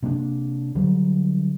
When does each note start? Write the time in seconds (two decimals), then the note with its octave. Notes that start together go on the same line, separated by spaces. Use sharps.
0.03 C3 A#3 B3 D4
0.75 D3 F#3 G3